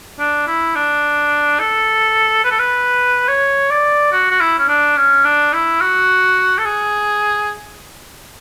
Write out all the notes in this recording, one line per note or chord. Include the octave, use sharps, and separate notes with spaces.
D4
E4
D4
A4
B4
A4
B4
C#5
D5
F#4
F#4
E4
C#4
D4
C#4
D4
E4
F#4
A4
G#4